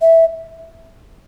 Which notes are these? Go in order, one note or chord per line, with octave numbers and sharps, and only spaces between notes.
E5